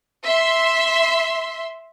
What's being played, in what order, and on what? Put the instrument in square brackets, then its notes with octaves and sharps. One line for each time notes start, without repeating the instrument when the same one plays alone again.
[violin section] E5 C6